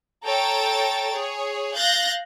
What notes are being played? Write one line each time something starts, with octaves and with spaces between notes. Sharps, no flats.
A4 C#5 G5 A#5 A6
G#4 C#5
F5 F#6 G6 A6 A#6